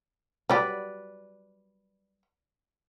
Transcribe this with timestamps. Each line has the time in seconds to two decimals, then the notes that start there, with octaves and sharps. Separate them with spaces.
0.49 F#3 G3 G4 B4 D5